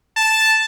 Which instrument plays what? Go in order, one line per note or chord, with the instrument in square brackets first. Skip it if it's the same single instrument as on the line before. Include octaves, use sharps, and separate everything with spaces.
[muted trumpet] A5